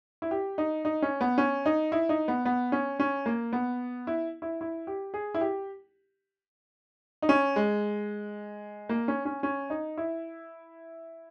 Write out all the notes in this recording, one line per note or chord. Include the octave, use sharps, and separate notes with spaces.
E4
G4
D#4
D#4
C#4
B3
C#4
D#4
E4
D#4
B3
B3
C#4
C#4
A#3
B3
E4
E4
E4
G4
G#4
E4
G4
D#4
C#4
G#3
A#3
C#4
C#4
C#4
D#4
E4